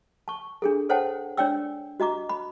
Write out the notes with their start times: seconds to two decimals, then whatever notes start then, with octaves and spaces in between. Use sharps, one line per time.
0.28 A5 C#6
0.62 D4 G#4 A4
0.89 A4 C5 C#5 F#5 G5 A5
1.37 D4 C#5 D5 G5 E6
2.00 F#4 D#5 A#5 D6
2.29 B5